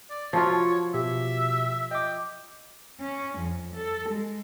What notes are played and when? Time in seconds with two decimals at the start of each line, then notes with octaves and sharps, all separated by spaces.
0.10 D5
0.33 F3 F#3 F4 C#5
0.94 B2 G4 E5
1.91 D#5 G5 D6
3.01 C#4
3.38 F2
3.75 A4
4.08 G#3